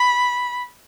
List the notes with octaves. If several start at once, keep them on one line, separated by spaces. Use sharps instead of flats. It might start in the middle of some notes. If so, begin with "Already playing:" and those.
Already playing: B5